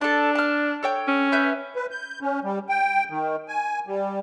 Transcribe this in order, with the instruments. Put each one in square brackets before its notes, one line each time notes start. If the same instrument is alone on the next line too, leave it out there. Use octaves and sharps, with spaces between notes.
[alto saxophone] D4 [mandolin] A4 A5
[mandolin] A5 F6
A4 C#5 G5
[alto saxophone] C#4
[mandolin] B4 E5 G6
[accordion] B4
G6
C#4
G3
G5
D#3
G#5
G3